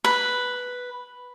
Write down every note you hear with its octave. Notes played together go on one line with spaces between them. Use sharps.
B4